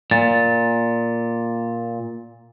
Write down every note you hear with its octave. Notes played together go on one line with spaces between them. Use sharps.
A#2 A6